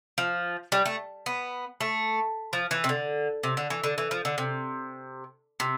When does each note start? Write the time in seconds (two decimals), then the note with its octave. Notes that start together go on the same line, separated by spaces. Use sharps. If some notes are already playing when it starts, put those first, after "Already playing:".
0.18 F3
0.72 G3
0.86 A3
1.26 B3
1.81 A3
2.53 F3
2.71 E3
2.84 C3
2.89 D3
3.43 C3
3.57 D3
3.70 E3
3.84 D3
3.98 E3
4.11 F3
4.25 D3
4.38 C3
5.60 C3